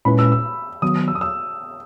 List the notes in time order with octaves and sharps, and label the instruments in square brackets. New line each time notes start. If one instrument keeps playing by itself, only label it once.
[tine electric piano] A#2 G#3 C#4 E4 B4 [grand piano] B5
[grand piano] E6
E6
[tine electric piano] D#3 F#3 B3 [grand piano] D#6
[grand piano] E6
D#6
E6